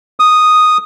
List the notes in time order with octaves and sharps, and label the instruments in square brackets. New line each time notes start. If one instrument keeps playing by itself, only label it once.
[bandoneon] D#6